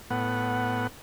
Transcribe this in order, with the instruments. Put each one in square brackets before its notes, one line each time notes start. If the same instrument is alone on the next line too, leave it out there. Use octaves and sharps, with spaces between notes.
[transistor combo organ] A2 B3 F#5